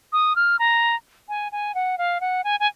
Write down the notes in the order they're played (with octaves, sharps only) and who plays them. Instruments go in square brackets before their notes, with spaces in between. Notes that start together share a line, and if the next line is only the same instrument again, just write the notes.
[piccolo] D#6
F6
A#5
G#5
G#5
F#5
F5
F#5
G#5
G#5